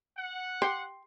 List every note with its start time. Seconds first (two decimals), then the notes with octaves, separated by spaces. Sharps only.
0.17 F#5
0.62 G4 C6